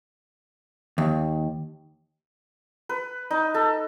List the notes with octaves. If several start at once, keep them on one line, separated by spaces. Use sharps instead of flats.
D#2
B4
D#4
A4